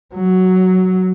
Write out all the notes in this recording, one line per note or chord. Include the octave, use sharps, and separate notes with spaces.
F#3